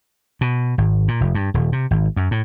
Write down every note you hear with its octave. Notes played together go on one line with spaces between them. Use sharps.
B2
G#1
A#2
F1
G2
D#1
C3
G#1
F#2
A2